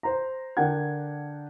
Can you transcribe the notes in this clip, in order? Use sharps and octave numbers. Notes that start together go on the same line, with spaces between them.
C5 A#5
D3 D4 A#4 F#5 G5 G#6